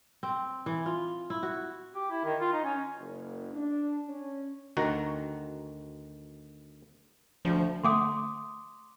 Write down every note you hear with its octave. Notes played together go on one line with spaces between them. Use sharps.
C4
E3
F4
E4
F#4
G4
E4
D#3
F4
D#4
C#4
F#1
D4
C#4
D2 D#3 F#4 A#5
D2 F3
D3 A3 F#5 C6 D6 D#6